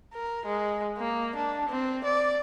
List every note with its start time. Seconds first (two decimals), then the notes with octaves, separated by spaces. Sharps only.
0.14 A#4
0.46 G#3
0.98 A#3
1.36 D4
1.69 C4
2.05 D5